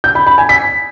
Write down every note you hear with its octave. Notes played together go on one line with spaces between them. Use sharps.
G6
B5
B5
G#5
B6